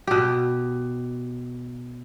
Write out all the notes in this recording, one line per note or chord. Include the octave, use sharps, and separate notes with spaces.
B2 G4